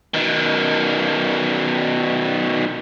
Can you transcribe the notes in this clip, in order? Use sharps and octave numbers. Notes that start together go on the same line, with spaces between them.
B2 D#3